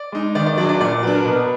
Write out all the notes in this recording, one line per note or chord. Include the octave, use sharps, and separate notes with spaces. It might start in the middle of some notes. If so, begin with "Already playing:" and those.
Already playing: D5
G#3 D#4
D#3 D5
D5
F#3 D4 D5
D5
A#2 D5
F#3 D4 B4
A#4
B2 B4